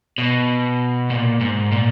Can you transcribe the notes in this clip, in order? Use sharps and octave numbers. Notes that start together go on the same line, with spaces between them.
B2
A#2
G#2
A#2